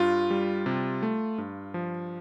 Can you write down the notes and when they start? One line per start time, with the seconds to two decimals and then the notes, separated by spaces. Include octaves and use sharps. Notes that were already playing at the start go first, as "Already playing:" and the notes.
Already playing: G2 F4
0.30 G3
0.66 C3
1.03 A3
1.38 G2
1.74 F3